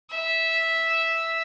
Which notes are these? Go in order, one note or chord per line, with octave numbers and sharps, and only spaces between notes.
E5